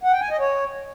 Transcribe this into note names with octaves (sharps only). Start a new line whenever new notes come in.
F#5
G5
G#5
D#5
C#5